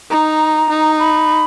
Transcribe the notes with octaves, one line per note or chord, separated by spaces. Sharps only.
D#4 A#5
D#4
B5